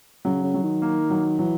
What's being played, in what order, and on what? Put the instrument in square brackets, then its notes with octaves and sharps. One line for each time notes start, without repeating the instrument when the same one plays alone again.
[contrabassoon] C#3 [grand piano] F#3
[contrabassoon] C#3
[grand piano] F#3
[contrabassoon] D#3
[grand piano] A#3
F#3
[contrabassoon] E3 [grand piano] F#3